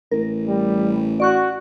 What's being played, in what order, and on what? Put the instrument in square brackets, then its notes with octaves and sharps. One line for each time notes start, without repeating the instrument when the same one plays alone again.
[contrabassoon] A1 [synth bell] A#4
[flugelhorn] G3
[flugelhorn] F#4 [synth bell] D5 C#6 F#6